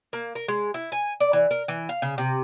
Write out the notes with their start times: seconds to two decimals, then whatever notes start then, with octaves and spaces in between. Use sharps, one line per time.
0.13 A#3
0.35 A#4
0.48 G#3
0.74 E4
0.92 G#5
1.20 D5
1.33 E3
1.51 A#4
1.68 E3
1.89 F5
2.02 C#3
2.18 C3